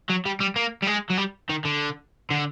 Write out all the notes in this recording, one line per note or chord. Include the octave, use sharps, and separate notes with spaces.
F#3
G3
G3
A#3
G3
G#3
F#3
G3
D#3
D3
D3